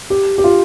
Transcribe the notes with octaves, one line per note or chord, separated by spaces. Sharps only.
G4
G4
F4